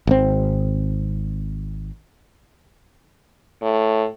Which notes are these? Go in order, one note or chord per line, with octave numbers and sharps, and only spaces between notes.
G#1 C4
A2